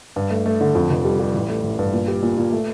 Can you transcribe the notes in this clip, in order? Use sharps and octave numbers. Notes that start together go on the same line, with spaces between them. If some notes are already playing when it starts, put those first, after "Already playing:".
G2
A3
A3
D3
F2
F1
G3
G3
A1
A3
A1
G2
A#2
G3
A#2
A#2
A3